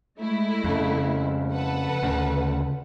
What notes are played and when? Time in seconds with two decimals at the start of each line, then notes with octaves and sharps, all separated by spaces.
0.19 G#3 A3 E4
0.64 F2 C#3
1.53 A4 B4 F#5
2.03 D2 C#3